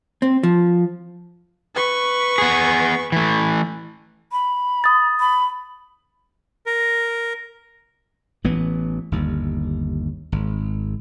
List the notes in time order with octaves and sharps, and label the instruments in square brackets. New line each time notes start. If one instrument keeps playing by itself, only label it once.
[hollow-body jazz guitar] C4
F3
[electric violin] B4 C#6
[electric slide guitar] B3 G#4
E3 A3
[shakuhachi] B5
[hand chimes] D#6 A6
[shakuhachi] B5
[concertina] A#4
[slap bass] A1 E3 B3
G1 D#2
G#1